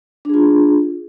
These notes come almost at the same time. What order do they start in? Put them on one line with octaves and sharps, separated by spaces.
D4 G#4 F4